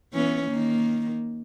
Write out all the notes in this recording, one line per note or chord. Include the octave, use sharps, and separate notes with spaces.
E3 B3 C#4
D#3 A#3